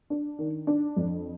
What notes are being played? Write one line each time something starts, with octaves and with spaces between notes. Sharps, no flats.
D4
D#3
D4
F2